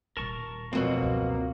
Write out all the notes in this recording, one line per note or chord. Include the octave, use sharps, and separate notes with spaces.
D#1 G3 A#4 A5 C#6
F2 B2 F#3 A#3 C4 F#4
C#2 G2